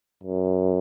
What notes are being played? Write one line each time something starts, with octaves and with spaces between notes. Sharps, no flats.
F#2